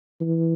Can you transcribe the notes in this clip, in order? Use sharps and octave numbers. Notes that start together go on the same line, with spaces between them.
E3